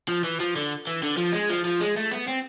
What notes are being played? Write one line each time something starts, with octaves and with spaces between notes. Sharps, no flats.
F3
E3
F3
D3
E3
D3
F3
G#3
F3
F3
G#3
A3
B3
C4